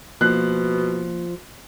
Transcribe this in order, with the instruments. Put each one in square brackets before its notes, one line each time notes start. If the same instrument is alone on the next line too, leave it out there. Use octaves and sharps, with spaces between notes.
[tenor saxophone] B2 [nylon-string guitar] F3 [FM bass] A#3 [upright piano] F#6